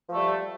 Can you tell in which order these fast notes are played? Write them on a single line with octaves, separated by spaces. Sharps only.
F3 A3 G3